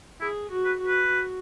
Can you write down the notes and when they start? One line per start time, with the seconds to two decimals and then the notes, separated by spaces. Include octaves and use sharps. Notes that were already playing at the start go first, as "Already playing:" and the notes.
0.21 E4 G#4
0.50 F#4
0.65 B4
0.79 F#4
0.87 B4
1.09 F#4